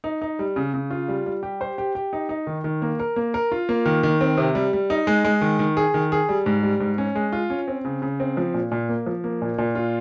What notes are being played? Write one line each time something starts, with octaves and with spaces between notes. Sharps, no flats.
D#4
D#4
G3
C#3
C#3
F4
G3
G3
G4
C5
G4
G4
D#4
D#4
D#3
D#3
A#3
A#4
A#3
A#4
F4
A#3
D#3
D#3
C4
C3
G3
G3
D#4
G#3
G#3
D#3
D#3
G#4
D#3
G#4
G3
G#2
G3
G#2
C#4
G#3
F4
C#4
C4
C#3
C#3
C4
F3
A#2
A#2
A#3
F3
A#3
A#2
A#2
F4